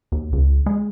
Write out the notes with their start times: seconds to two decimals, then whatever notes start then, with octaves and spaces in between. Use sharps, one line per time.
0.12 D#2
0.32 C#2
0.66 G#3